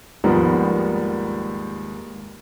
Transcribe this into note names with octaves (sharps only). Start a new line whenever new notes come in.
D#2 G#2 D#3 F3 G3 B3